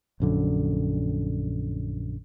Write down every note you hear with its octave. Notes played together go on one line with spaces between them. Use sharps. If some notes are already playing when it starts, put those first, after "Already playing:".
A#1 F#2 D3